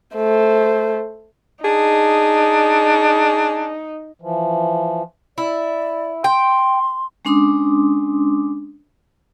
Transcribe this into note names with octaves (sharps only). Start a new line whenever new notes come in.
A3 C5
D4 D#4 G#4
E3 F3
E4 D5
G5 C6
G#3 C#4 D4 C6 D6 D#6